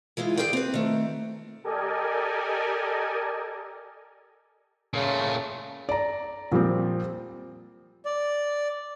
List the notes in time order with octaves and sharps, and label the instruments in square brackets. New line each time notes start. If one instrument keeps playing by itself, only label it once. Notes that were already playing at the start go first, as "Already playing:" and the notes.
[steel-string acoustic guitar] E3 G#3 E4 F4
G4 G#4 B4 C5 D5 G5
C4 B4
D#3 A3
[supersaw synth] G4 A4 A#4 D5 D#5 G#5
[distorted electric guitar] A#2 A3 [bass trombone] C#3
[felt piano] D5 A#5
A#2 F3 G3 C4
[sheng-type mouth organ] D5